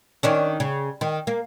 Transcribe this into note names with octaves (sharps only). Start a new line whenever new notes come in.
D#3 C#4 D4
C#3
D#3
A#3